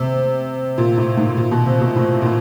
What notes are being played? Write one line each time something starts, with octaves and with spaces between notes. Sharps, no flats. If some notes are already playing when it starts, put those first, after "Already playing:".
Already playing: C3
A#2
A2
G#2
A#2
B2
C3
B2
A2
A#2
A2